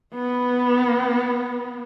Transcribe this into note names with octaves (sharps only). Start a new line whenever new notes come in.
B3